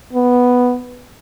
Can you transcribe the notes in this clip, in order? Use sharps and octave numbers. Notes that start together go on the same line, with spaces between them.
B3